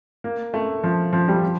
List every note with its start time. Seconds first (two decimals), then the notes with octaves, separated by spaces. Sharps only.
0.24 A#3
0.54 A3
0.84 F3
1.13 F3
1.28 G3
1.43 F3